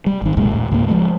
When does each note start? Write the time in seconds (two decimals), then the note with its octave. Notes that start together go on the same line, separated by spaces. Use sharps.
0.06 G3
0.22 G#1 D#3
0.37 C2 F#2 A#2 G#3
0.51 D#1 A2
0.71 C#2 G#2 A#3
0.88 F3 F#3 G#3 A3